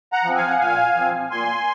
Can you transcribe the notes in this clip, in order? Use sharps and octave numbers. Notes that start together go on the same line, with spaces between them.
F#5 A#5
F3 C4
F5 G#5
F#5
A#2 F5 G#5
F3 C4
A#2 G#5 C6